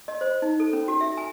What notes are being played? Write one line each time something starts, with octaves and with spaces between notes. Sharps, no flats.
D#5
C5
D#4
A4
C#4
F#4
E5
G#5